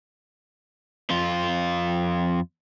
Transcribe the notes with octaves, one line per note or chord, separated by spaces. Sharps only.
F2 F4